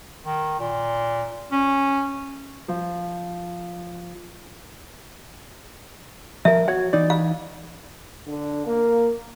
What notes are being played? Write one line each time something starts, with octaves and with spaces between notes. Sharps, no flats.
D#3
A#2
C#4
F3
F3 A#4 E5
F#4 C#5 F#5
E3 D#4 D5
F5
D3
A#3